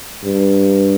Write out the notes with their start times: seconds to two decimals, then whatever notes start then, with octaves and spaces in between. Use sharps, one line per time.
0.24 G2